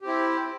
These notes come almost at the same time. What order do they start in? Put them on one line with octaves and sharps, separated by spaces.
G4 C4 E4